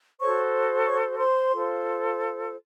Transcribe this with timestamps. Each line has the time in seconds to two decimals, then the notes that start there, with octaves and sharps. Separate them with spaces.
0.21 F#4 A4 C5 C#5 C#6
0.86 C#5 C#6
1.18 C5 C6
1.51 F4 A4 C5